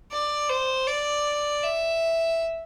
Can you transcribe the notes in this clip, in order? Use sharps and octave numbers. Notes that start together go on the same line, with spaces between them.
D5
C5
D5
E5